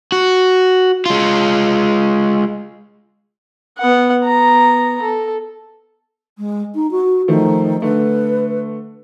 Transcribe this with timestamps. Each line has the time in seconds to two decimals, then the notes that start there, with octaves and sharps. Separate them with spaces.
0.12 F#4
1.06 G#3 F4
3.78 B3 F#5
4.24 B3 A#5
5.02 A4
6.37 G#3
6.75 D#4
6.91 F#4
7.28 D#3 F3 A3
7.82 D3 A3 B4